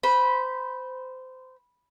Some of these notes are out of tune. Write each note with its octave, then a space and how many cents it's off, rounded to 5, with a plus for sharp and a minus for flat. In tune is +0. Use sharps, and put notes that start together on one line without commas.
C5 -25 B5 -10